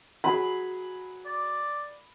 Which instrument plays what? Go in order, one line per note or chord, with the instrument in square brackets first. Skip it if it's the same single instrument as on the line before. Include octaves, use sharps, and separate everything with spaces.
[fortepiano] F#3 G#4 [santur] B5
[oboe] D5